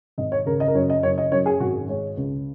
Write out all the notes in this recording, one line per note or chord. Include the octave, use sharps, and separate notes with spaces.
G#1 D#5
C#5
C#3 A#4
D#5
A#4
F#2 C#5
D#5
F#1 C#5
D#5
F#2 C#5
G#4
G#1 F#4
G#3 C#5
C#2